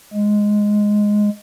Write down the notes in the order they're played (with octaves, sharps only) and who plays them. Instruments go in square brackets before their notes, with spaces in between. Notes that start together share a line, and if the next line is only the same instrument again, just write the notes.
[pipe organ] G#3